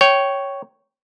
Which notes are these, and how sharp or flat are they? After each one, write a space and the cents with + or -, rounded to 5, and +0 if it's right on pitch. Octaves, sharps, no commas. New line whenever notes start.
C#5 +0 G5 -15